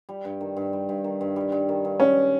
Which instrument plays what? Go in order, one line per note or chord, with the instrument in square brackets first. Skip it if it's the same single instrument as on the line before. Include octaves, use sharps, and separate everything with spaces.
[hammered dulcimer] G3
G2
D#3
G2
G3
G2
D#3
G2
G3
G2
D#3
G2
[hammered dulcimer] G3 [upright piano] C#4